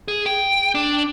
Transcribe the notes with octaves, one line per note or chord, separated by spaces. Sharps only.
G#4
G5
D4